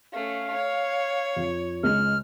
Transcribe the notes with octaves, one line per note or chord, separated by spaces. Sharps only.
A3 C#4 F5
C#5
F2
C#2 G#3 F6